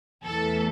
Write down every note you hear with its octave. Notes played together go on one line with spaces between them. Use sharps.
E2 E3 A3 A4